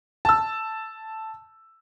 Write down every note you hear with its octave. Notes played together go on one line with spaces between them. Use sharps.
A5 E6